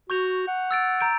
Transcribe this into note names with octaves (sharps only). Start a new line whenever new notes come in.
F#4 C#6 G6 F7
F#5
E6 A6 D7
A#5 G6 D7